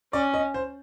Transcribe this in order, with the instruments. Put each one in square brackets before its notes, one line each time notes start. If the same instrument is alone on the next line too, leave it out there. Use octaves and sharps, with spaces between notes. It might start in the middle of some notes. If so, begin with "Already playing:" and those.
[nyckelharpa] C#4 [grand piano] D5
[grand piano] D#5
C5